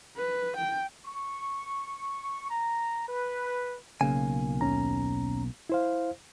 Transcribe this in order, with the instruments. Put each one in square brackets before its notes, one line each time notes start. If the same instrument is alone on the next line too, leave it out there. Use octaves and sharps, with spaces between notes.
[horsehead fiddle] B4
G5
[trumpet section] C#6
A#5
B4
[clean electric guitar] B1 A#3 G#5 [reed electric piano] C#3
[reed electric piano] D#2 C#4 A#5
E4 C5 F5